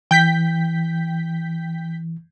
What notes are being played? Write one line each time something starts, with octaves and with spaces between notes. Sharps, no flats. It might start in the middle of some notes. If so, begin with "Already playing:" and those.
E3 G5 G6 B6